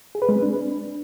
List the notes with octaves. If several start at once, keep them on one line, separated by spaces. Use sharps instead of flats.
G#4
B4
G#3
C4
D4